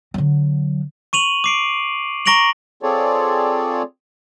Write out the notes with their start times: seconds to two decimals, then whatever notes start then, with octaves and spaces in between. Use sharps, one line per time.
0.14 D3 F#3
1.13 C#6 D#7 F7 F#7
1.44 D6 C7 D7
2.26 A#5 C#6 A#6 D7 F7 F#7
2.83 C4 F4 G#4 A4 C#5 D5